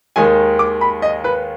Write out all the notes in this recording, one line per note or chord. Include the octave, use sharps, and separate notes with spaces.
D#2 D#3 G#3 G#5
D6
B5
D#5
B4